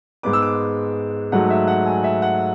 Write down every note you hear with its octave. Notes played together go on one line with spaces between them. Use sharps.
G#2 G#3 B3 D6
E6
D6
G#2 F#3 A3 F#5
E5
F#5
G#5
E5
F#5